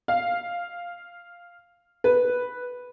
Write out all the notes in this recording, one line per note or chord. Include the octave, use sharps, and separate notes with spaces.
F5
B4